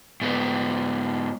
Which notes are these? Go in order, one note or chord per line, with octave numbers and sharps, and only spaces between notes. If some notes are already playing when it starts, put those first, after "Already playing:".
G#2 B3